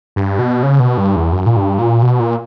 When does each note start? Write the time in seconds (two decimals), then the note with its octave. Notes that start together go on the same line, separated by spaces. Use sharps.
0.16 G2
0.39 B2
0.63 C#3
0.80 B2
0.97 G2
1.16 E2
1.32 F#2
1.46 A#2
1.56 G2
1.79 A#2
2.02 B2
2.20 A#2